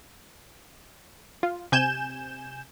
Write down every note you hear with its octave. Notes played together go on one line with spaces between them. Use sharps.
F4
C3 G#5 G6 E7